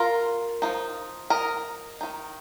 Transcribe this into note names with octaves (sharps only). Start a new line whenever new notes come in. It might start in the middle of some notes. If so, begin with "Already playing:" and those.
Already playing: F4 A#4
F3 A#3 D#4
A#4 D#5
D#3 A#3 D#4